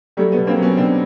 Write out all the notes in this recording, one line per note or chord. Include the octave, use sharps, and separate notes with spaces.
F#3 G3 A3
B2 A3 B3
A#3 C4
F#3
B3 C#4
B2 C4 D4